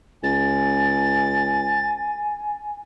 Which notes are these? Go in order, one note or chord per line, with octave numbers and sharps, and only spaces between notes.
C#2 G#5 A6